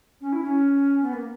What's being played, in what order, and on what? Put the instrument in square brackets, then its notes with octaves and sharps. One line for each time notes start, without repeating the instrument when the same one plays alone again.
[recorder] C#4
E4
C#4
B3
A#3